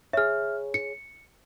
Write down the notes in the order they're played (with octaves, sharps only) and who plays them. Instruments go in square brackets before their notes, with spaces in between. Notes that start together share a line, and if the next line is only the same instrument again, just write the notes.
[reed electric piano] G#4 C#5 [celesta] E5 F6
[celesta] C#7